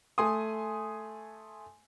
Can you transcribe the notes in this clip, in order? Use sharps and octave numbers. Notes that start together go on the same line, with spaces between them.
A3 G#5 C6 D#6